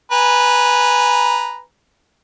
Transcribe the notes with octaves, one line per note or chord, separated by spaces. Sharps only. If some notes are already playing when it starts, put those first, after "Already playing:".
B4 G#5 A#5